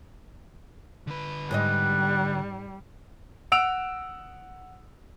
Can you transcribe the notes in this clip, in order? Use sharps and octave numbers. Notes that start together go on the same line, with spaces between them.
D3 B4
G#2 G3 C5 D#5 F#5
F#5 E6 D7 F7